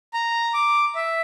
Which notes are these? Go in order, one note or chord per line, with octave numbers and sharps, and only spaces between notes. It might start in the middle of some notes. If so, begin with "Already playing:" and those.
A#5
D6
E5